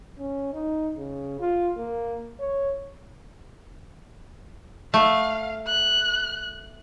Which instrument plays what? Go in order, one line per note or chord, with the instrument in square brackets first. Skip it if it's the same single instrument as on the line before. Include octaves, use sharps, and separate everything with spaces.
[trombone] C#4
D#4
C#3
F4
A#3
C#5
[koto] A3 [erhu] F5
[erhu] F#6